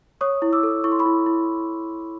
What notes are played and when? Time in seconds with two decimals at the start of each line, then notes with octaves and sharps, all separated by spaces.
0.21 C#5 C#6 D#6
0.42 E4
0.53 D6 E6
0.63 A4
0.84 E4 C#6
0.92 C6
0.99 B5 C#6
1.06 E4
1.26 E4